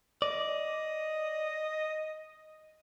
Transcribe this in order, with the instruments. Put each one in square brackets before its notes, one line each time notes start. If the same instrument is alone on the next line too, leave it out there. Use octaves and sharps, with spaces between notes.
[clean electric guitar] D5 [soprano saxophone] D#5